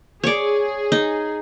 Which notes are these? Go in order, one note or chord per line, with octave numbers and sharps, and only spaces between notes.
G#4 C#5 D5
D#4